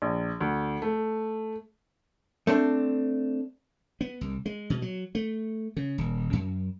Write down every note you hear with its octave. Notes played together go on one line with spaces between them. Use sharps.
A#1
D2
A3
A3 C4 D4
B3
C2
G#3
B2
F#3
A3
C#3
D#1
F#2